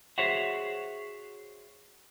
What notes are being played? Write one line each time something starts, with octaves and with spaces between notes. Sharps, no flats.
F#4 G#4 C5 C#5 E5 F#5